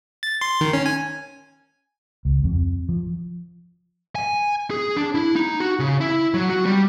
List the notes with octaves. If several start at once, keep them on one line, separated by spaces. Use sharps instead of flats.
A6
C6
D#3
C#4
G#5
C#2
F2
F3
G#5
G#4
D4
E4
D#4
F#4
C#3
E4
F#3
F#4
G3